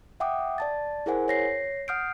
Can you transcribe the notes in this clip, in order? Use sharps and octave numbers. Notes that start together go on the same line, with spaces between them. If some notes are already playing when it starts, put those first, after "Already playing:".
E5 F#5 G5 D6 D#6
D5 A5 A6
E4 G#4 A#4 C5 F#5 G#5
C#5 A#6 C7
F#5 D#6 F6 G6 C7 D7